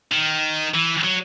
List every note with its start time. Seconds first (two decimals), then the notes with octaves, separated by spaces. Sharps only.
0.12 D#3
0.74 E3
1.04 F#3